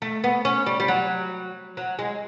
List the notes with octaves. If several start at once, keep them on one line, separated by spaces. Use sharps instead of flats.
A3
B3
C#4
G3
G3
F#3
F#3
G#3